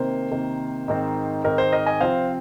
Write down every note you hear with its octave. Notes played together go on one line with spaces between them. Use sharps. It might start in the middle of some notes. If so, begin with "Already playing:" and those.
Already playing: C3 D#3 A#3 C5
C3 D#3 A#3
G#2 D#3 C4
G#2 D#3 C4 A#4
C5
A#4 D#5
D#5 G#5
C3 F3 C4 C5 F5